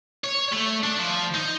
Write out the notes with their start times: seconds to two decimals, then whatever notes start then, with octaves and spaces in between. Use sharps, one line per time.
0.24 C#5
0.53 A3
0.84 D4
0.99 F3
1.34 D#4